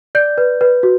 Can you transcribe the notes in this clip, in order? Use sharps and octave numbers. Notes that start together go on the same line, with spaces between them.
D5 G6
B4
B4
F#4